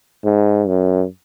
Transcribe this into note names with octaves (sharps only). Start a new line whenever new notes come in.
G#2
F#2